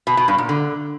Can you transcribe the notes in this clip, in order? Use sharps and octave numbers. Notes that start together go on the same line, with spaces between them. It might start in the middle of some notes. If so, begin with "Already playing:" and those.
B2
B2
G2
A#2
D3